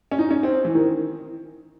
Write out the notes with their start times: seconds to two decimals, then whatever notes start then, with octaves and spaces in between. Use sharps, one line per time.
0.11 C#4
0.19 D#4
0.31 C#4
0.43 C4
0.65 E3
0.75 D#3